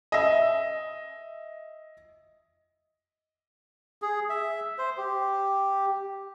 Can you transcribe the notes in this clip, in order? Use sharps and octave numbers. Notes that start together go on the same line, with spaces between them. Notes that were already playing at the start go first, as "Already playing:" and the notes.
D#5 E5
G#4
E5
C5
G4